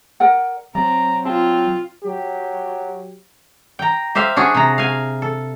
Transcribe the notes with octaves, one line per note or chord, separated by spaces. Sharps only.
A#4 D5 F#5
F#3 C4 D5 A#5
C4 F4 A5
F#3 G4
G5 A#5
G4 C5 E5 F5
D4 F#4 G#4
C3 A#5
F5 G#5
A4